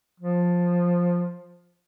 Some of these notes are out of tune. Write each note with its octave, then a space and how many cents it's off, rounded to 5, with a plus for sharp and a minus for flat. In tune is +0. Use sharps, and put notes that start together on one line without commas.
F3 +10